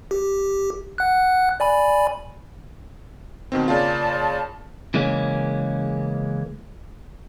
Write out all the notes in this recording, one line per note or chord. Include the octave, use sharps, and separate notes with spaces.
G4
F#5 F#6
D5 G#5 B5
B2 D#3 C4
C#3 A#3 F4 D5 A5
C#3 E3 G#3 A#3 C#4